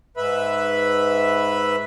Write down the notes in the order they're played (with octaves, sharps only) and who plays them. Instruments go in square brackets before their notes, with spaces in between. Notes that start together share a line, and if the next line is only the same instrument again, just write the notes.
[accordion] G#2 B4 E5 B5